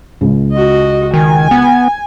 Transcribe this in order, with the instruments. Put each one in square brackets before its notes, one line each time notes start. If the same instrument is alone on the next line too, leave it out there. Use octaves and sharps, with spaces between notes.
[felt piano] C#2
[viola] F#4 D#5
[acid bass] D#3 [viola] G#5
[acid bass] B3